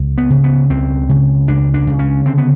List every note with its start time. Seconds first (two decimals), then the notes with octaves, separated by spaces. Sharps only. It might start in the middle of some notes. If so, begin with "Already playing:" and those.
Already playing: C#2
0.18 B3
0.30 C#3
0.44 B3
0.70 C#2 C4
1.09 C#3
1.48 C#2 D4
1.74 D4
1.87 C#3
1.99 C#4
2.25 D3 C4
2.38 B3